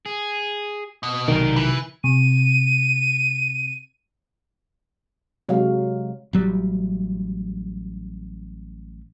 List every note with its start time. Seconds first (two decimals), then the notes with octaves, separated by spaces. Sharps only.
0.06 G#4
1.03 B2
1.28 B1 C3 D#3 A#4 D5
1.56 E3 B4
2.04 C3 D#7
5.49 C3 F#3 G#3 F#4 F5
6.33 A1 F#3 G3